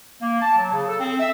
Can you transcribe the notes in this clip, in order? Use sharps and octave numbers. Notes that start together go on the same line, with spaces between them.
A#3
A5
F#3
C#3
A4
C4
E5